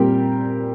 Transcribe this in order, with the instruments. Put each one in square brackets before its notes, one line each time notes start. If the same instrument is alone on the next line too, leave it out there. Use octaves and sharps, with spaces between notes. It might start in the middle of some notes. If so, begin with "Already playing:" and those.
Already playing: [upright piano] A#2 G3 C4 G4 A#4